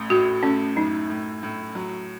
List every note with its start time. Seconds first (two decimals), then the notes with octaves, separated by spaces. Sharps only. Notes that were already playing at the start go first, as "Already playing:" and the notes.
Already playing: A1 A3
0.10 A2 F#4
0.43 A3 C#4
0.76 F#2 D#4
1.10 A2
1.43 A2
1.75 F#3